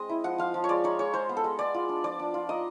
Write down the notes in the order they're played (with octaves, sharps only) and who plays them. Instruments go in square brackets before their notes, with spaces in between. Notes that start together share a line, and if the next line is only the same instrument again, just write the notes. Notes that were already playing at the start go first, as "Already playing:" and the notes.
Already playing: [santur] G#3 C4 D#5
E4
F3 F#5
F3 F5
F3
C#5
G#3 D5
D#4 C#5
G#3 C#5
G#3 C5
B3
A4
G#3
B3 D5
F4
D4
F3 D5
D4
F4
D#4 D#5